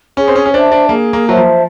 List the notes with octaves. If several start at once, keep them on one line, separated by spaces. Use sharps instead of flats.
C#4 G#4
C4
C#4
C#4
D4 C5 E5 A5
D4
A#3 G#4
A#3
F#3 C5 E5 A5
F3